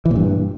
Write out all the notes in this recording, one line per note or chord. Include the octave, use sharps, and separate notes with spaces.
E3
A#2
G2